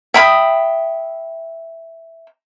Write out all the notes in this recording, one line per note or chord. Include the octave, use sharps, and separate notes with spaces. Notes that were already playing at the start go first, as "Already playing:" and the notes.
E5 G5 B5 D#6